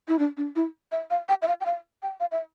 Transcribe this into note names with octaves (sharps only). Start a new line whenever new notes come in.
E4
D4
D4
E4
E5
F5
G5
E5
F5
G5
F5
G5
F5
E5